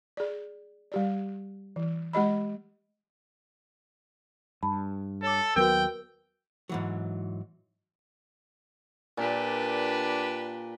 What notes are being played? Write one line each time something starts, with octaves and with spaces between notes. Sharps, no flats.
G#4 D5
G3 G4 D5
E3
G#3 G4 D#5 B5
G2 A5 B5
A4 C#5 D6
D#2 F#3 B3 F#4 A#4 B4 G5 E6
G#2 E3 F#3
A#2 D4 G4 B4